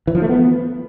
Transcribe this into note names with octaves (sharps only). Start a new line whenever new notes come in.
E3
F3
A3
B3